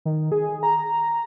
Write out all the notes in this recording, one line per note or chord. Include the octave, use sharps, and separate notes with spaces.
D#3
G#4
A#5